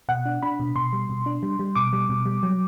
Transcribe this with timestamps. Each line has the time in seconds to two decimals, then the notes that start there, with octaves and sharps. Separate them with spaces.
0.09 B2 F#5
0.26 D4
0.42 D4 B5
0.60 B2
0.76 B2 C6
0.93 G3
1.09 B2
1.26 D4
1.43 G3
1.59 G3
1.75 B2 D6
1.93 G3
2.09 B2
2.26 G3
2.43 F#3